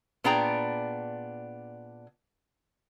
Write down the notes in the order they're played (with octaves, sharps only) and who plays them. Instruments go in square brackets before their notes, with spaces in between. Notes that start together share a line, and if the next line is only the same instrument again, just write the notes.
[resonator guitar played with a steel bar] A#2 B3 D4 G#4 G5 A#5